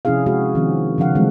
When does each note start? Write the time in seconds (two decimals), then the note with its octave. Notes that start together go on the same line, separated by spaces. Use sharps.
0.05 C3 F3 C#4 E4 G#4 F5
0.26 G#3 F#4 G#4
0.55 D#3 F3 C4
0.98 C#3 F3 D4 F5 F#5
1.15 D3 E3 F#3 G#3 A3 C4